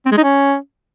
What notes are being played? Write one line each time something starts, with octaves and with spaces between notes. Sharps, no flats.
C4
G#3
D#4
C#4